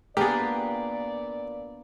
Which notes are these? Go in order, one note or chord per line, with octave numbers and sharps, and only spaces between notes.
A#2 A#3 B3 D4 G4 G#4 D5